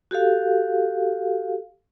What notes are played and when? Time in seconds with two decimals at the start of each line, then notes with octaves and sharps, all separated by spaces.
0.11 F#4 G4 A4 F5